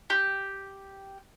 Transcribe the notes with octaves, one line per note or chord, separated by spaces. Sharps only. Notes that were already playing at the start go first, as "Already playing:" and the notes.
G4